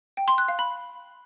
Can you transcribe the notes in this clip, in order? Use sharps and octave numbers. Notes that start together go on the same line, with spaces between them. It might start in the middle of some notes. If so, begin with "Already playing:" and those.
G5
C6
F#6
F5
B5